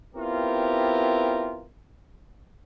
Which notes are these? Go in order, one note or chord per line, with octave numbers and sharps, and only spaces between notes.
B3 C4 E4 F4 G4 A#4